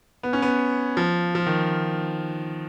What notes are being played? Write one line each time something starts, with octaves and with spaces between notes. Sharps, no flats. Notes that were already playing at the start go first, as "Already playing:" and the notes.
B3
C#4
B3
F3
F3
D#3